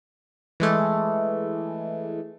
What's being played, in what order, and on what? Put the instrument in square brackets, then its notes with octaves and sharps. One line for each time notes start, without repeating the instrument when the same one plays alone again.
[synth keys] E3 G#3 A3